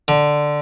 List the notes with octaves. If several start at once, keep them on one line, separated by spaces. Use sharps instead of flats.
D3